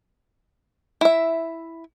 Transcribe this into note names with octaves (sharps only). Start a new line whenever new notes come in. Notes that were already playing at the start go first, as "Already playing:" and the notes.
E4 E5